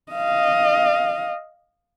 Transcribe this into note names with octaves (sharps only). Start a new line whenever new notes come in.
D#5 F5